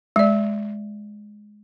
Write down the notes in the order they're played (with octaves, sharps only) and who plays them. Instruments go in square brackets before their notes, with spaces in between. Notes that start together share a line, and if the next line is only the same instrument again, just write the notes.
[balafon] G#3 D5